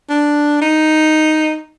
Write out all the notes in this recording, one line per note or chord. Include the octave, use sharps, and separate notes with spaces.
D4
D#4